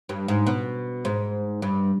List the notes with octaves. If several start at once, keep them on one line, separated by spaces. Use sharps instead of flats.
G2
G#2
B2
G#2
G2